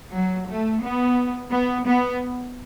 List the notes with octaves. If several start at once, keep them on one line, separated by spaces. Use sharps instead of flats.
F#3
A3
B3
B3
B3